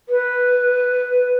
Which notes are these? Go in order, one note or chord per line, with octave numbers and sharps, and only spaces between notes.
B4